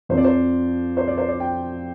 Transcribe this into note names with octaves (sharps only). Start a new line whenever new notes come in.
F2 F3 C4 C5
D5
C5
C5
D5
C5
D5
G5